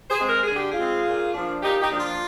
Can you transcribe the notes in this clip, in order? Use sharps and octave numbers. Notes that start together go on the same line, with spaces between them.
G#4 C5
G#3 C4
A#4
G#4
D3
G4
F4 G#4
G#3 C4
A#2
F3 A#3 D4
A#2 D#4 G4
D#4 G4
F3 A#3 D4
F4